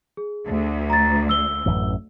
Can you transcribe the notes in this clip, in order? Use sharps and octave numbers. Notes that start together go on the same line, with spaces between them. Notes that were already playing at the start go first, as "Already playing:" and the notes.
G#4
D2
A#5 A6
E6 G7
A1 F#2 E3